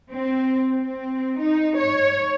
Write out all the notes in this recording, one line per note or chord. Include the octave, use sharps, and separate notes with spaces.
C4
C4
D#4
C#5